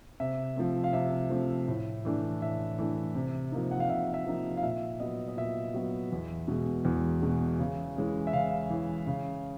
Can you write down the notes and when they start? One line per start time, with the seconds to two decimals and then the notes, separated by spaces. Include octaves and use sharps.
0.20 C3 E5
0.56 F3 A3 C4
0.84 F5
0.93 C3 E5
1.30 F3 A3 C4
1.68 A2
2.05 E3 A3 D4
2.42 A2 E5
2.78 E3 A3 D4
3.15 C3
3.52 F3 A#3 D#4
3.71 F#5
3.80 F5
3.89 C3 E5
4.14 E5
4.27 F3 A#3 D#4
4.57 F5
4.63 A#2 E5
5.00 F#3 B3 D#5
5.28 D#5
5.37 A#2 E5
5.74 F#3 B3
6.12 E2
6.48 B2 G#3
6.85 E2
7.22 B2 G#3
7.59 C#3
7.96 E3 G#3 C#4
8.27 E5
8.33 C#3 F5
8.70 E3 G#3 C#4
9.07 C#3